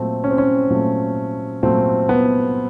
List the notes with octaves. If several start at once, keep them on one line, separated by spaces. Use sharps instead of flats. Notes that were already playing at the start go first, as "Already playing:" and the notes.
Already playing: A#2 F#3 A3 C4
C#4
C4
C#4
A#2 F#3 A3
A#2 F#3 A3 C4
B3